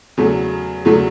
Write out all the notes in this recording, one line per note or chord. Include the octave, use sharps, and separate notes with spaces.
E2 C#3 F#3 A3
E2 C#3 F#3 A3